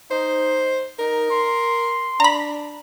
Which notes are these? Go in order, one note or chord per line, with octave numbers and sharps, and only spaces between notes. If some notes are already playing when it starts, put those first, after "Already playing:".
D#4 C5
D#4 A#4
C6
D4 A#5 B5